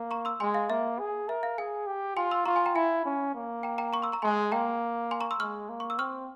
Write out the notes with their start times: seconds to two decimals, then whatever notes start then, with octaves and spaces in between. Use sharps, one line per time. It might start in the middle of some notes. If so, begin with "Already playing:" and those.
Already playing: A#3
0.11 A#5 C#6
0.25 C6 E6
0.40 G#3 G#5 C6
0.54 F5
0.70 A#3 E5
0.99 G#4
1.28 A#4 E5
1.43 F5
1.58 G#4 F5 G#5
1.87 G4
2.17 F4 G#5 C6
2.31 C6 E6
2.46 F4 A#5 C#6
2.56 G#5 C6
2.66 G5 A#5
2.75 E4 F5 G#5
3.05 C#4
3.35 A#3
3.63 G5 A#5
3.78 G5 A#5
3.93 A#5 C#6
4.02 C6 E6
4.12 A#5 C#6
4.22 G#3 G#5 C6
4.52 A#3 G5 A#5
5.11 G#5 C6
5.21 A#5 C#6
5.31 C6 E6
5.40 G#3 C#6 F6
5.69 A#3
5.80 C#6
5.90 E6
5.99 C4 C#6 F6